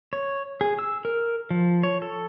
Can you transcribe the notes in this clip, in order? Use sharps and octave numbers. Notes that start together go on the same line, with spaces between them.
C#5
G#4
E6
A#4
F3
C#5
A4